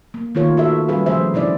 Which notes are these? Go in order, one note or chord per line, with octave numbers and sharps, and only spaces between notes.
A#3
D#3 A3 A#3 F4 A#4 C#5
F#4 G4 A4 B4 E5
G3 C#4 G#4 B4 F5
C#3 F3 A3 C5 E5
C#3 D4 E4 D5